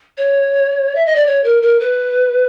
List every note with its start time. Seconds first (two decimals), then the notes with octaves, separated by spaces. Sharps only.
0.18 C#5
0.95 E5
1.06 D#5
1.16 D5
1.26 C#5
1.44 A#4
1.62 A#4
1.80 B4